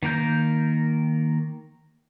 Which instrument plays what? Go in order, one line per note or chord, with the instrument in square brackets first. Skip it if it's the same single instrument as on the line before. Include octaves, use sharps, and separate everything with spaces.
[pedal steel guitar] D#3 A#3 A#4 G6